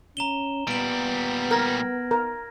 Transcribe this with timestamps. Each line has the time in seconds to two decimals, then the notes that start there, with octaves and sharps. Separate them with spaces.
0.17 C#4 A#5 E7 G7
0.67 A#2 G3 B3 D7 F#7
1.51 A#4 F6 G#6 A#6
2.11 A#4